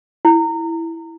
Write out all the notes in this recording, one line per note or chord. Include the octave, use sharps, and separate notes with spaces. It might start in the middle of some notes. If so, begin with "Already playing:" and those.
E4